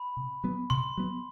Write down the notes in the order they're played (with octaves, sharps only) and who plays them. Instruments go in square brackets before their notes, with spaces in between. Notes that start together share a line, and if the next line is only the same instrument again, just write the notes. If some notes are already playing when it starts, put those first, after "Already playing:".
Already playing: [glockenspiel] B5
[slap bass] C3
F#3 B3
[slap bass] C3 [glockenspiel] C6
[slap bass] F#3 B3